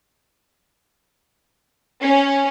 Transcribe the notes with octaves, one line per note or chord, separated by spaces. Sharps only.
C#4